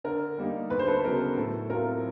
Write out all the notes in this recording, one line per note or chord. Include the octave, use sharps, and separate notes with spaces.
D3 A#4
G3 A#3 D#4
D2 B4
C5
A4 B4
C#3 F#3 B3 D#4 A#4
A2 A4
F#3 A3 C4 F4 A#4